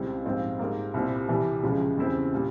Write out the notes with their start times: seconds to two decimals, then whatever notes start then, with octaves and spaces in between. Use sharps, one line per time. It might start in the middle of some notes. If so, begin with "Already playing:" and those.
Already playing: C#2 C#3 G3 C4 E4
0.25 A#1 G#2 G3 C4 F4
0.59 G#2 G3 A#3
0.94 C2 A#2 G3 C4 E4
1.28 C2 C3 E3 G3
1.63 C#2 C#3 F3 G#3
1.97 E2 C#3 G3 C4 E4
2.34 A#2 G3